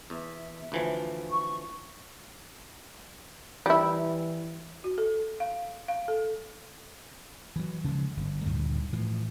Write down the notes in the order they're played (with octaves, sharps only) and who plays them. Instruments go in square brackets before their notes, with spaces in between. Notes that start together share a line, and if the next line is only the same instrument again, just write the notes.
[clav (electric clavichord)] E2 [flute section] E5
[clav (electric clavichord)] D2 E3 F3
[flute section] C#6
[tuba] E3 [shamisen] G3 E4
[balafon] F#4
A4
F5
F5
A4
[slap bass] E3 F#3
C#3 F3 F#3 G#3
G1
D2 G2 A#2 D#3
A2 E3 F3